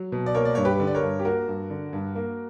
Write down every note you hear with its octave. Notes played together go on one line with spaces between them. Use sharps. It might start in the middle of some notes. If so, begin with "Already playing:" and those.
Already playing: F#3
B2
D5
A#3 A#4 C#5
D5
G2 C#5
G4 B4
D3
D5
A#4 C#5
G2
G4
A#3 F#4 A#4
G2
D3
G2
A#3